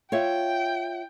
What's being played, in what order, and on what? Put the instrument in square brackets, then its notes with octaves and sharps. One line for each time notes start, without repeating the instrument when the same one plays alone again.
[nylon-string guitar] F4 C#5 E5 [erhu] G5